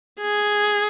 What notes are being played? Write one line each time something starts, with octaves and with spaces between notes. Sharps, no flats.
G#4